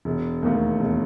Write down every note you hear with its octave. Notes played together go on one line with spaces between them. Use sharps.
E1
D#2 D#3 A3
E1